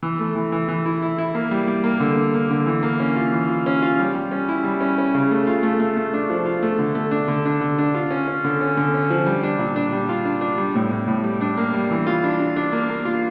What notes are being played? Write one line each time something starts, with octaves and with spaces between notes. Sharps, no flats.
E3
A3
E3
E3
E3
E4
E4
E4
A#3
G3
G3
A#3
D3
D3
A#3
D3
E3
A#3
C#4
F4
E3
F4
C#4
F4
G3
G3
C#4
E4
G3
C#4
C#4
C#3
A3
F4
A3
A3
A3
D4
F3
F4
A3
D3
A3
D4
D3
D4
D3
D4
F4
C#4
C#4
D3
C#4
D3
C#4
F3
G3
D4
A#2
D4
G3
F4
D4
D4
G3
A2
A2
A2
G3
D4
A#3
G3
E3
F4
D4
D4
D4
A#3
A#3
F4